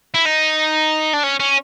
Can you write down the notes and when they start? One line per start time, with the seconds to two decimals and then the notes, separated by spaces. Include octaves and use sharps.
0.14 E4
0.25 D#4
1.13 D4
1.23 C#4
1.40 C#4